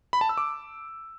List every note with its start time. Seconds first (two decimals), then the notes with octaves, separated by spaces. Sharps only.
0.13 B5
0.21 A5
0.29 E6
0.38 D6